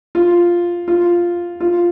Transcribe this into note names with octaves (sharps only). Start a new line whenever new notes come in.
F4
F4
F4